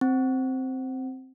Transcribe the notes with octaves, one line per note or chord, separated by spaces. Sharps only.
C4